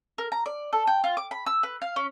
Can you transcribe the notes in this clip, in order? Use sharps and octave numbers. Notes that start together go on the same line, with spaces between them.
A#4
A#5
D5
A4
G5
F4
D6
B5
E6
B4
F5
C#4